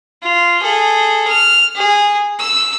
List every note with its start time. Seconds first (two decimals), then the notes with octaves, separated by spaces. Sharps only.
0.23 F4
0.61 G#4 A4
1.27 F6
1.75 G#4
2.39 E6